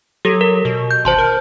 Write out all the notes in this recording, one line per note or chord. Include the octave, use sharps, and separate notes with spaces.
F#3 G4 A4
A#4
B2
G6
G#1 C5 A5 C6
A#4